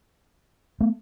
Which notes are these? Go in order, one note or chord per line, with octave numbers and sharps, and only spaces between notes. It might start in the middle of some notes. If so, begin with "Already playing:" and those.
A3 B3